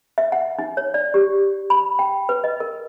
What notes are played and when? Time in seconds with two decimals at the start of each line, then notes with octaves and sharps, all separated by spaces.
0.18 E5
0.32 F#5
0.59 D#4
0.77 C#5
0.94 D5
1.14 G4
1.70 B5
1.99 G5
2.29 B4
2.44 D#5
2.60 A#4